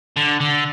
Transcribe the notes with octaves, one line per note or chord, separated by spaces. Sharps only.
D3
D3